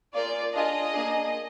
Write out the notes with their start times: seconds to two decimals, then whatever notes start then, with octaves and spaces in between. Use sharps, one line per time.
0.14 A#3 F4 G#4 D5
0.53 D4 F4 G#4 D#5
0.92 A#3 D4 G#4